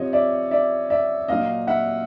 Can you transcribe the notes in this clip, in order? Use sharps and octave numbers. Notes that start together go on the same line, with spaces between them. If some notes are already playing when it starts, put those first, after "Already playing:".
Already playing: C3 F3 C#5 D#5
D5 E5
D5 E5
D5 E5
A#2 F#3 D#5 F5
E5 F#5